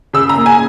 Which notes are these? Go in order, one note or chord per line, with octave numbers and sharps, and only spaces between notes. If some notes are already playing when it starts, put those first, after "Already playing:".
C#3 E6
A#5
A#3
G#5